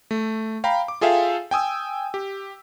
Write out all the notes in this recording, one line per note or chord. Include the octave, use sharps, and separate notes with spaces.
A3
F5 G5 A#5 B5
D6
F4 G#4 A4 E5 F5 G5
G5 G#5 D#6 E6
G4